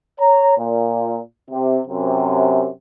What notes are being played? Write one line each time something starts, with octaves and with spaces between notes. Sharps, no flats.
C#5 A#5
A#2
C3
F#2 C3